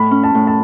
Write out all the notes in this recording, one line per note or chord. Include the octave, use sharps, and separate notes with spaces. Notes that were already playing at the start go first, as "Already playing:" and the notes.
Already playing: A2 B5
C#4
A5
A2
A5